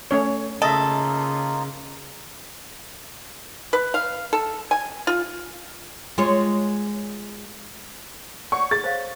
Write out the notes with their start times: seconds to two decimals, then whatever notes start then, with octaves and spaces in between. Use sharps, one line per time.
0.11 A3 C#4 C#5
0.62 C#3 A#3 D#4 F4 A4 D#5 E5
3.73 B4
3.94 F5
4.33 A4
4.71 G#5
5.07 F4
6.18 G#3 F4 C#5
8.52 C#5 D5 F#5 C#6
8.71 G#4 A6
8.84 C5 C#5 F5